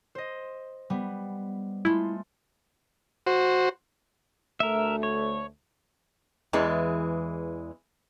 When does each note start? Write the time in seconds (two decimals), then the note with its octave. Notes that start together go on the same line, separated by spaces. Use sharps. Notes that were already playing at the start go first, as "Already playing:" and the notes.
0.15 C5 D#5
0.90 G3 B3
1.85 G#3 A3 E4 F4
3.27 F#4 C5
4.60 D2 A3 A#4 E5
5.03 C#5
6.53 E2 E3 G#3